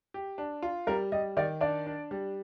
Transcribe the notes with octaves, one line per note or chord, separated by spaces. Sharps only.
G4
D4
F4
G3 A#4
G3 D#5
D#3 D5
D4 D5
D4
G3